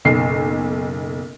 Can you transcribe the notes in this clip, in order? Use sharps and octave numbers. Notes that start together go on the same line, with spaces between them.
F#1 B1 C7